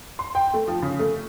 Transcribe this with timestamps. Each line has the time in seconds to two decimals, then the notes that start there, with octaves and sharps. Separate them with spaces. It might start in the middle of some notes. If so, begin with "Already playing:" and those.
0.19 C6
0.35 G5
0.54 A3
0.68 F3
0.82 C#3
0.99 A3